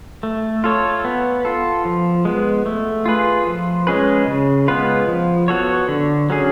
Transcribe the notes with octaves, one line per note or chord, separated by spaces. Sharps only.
A3
F4 A4 C#5
B3
F4 A4
F3
G#3 B3
A3
F4 G#4 B4
F3
G#3 C#4 G#4 B4
C#3
G#3 B3 F4 B4
F3
B3 F#4 A4 C#5
D3
F#3 C#4 G#4